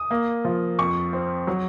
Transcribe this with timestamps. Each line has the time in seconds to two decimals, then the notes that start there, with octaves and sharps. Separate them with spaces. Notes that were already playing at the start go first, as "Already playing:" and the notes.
Already playing: D#6
0.11 A#3
0.45 F3
0.79 F2 C#6
1.13 C4
1.47 F#3